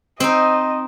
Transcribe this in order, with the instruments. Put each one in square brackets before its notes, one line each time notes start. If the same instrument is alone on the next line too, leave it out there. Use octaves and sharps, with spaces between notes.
[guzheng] C4 D#4 [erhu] D#5